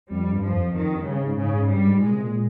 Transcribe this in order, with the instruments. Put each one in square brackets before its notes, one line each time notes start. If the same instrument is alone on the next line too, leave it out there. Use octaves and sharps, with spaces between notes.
[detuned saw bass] F2 [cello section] G3
[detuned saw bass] G2
[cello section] F3
[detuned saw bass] F2
[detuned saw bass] F2 [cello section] D#3
[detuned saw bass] G2
[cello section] C#3
[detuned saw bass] G#2
[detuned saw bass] G#2 [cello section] C#3
[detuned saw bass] G#2
[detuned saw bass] G2 [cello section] G3
[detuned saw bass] G#2
[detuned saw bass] A#2 [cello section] G#3
[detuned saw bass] C3
A#2